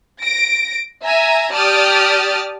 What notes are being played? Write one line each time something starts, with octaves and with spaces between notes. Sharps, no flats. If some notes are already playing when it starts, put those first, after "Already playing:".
A#6 D7
E5 G#5 A#5
G4 D5 A5 D#6 F6